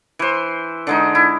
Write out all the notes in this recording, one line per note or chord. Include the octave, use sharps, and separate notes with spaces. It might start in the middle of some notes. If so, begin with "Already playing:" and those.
E3 C5
D3 G#3 D#4
E4